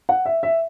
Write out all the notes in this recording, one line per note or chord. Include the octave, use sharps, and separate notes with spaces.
F#5
E5
E5